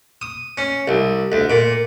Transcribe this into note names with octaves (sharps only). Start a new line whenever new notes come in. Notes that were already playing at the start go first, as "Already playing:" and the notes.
D#6
C#4
C2
D2
A#2